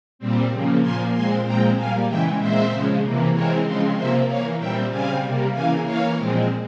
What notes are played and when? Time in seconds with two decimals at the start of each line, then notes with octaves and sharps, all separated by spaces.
0.19 A#2 G3 C4
0.52 C#3 F3 A#3
0.82 A#2 F3 A#3 G#5 C6
1.13 A#2 G#3 C4 G#5 C6
1.45 A#2 F3 G#3 C4 G5 A#5
1.76 A#2 G3 A#3 F5 G#5
2.07 C#3 E3 G#3 E5 G5
2.39 A#2 G#3 C4 C5 E5
2.71 C#3 F3 G#3
3.01 C3 E3 A#3
3.33 E3 G#3 C4 A#4 C#5
3.64 C#3 F3 G#3 C4 C5
3.96 C3 F3 A#3 C5 E5
4.27 E3 A#3 C#5 F5
4.59 A#2 G3 C4 E5 G5
4.90 C#3 G3 C4 F5 G#5
5.21 C3 G3 A#3
5.52 C#3 E3 A#3 F5 G#5
5.84 E3 A#3 C#5 F5
6.15 A#2 F3 G#3 C4